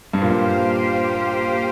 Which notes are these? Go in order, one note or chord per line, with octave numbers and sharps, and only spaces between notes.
G2 A#3 G4 C5 F5
A#2
G2